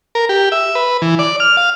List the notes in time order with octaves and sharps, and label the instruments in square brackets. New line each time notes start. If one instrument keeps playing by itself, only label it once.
[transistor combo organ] A#4
G4
E5
B4
E3
D5
F6
F5